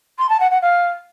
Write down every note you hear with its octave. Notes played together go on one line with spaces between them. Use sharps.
C6
A5
F#5
F#5
F5